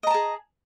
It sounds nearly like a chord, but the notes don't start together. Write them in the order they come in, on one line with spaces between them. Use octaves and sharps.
D#5 A#5 A5 G#4